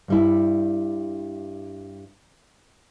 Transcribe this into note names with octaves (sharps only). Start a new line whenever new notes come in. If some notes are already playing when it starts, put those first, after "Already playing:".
G2 G3 E4